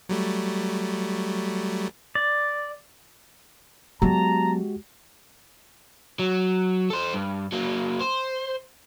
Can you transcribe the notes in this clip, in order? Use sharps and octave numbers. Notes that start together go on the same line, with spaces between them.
F#3 G3 A3
D5
F#3 G#3 B3 F#4 G4 A5 A#5
F#3
A4 C5
G2
F#3 A#3
C5